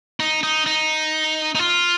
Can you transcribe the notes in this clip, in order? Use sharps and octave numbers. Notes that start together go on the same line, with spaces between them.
D#4
D#4
D#4
D#4
F4